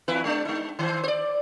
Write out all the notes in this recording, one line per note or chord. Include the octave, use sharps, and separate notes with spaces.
E2 E4 B4
G#3 D4
G#3 D#4
D#3 C5
C5 D5